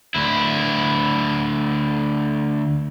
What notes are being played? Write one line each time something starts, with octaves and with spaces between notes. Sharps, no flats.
D2 E4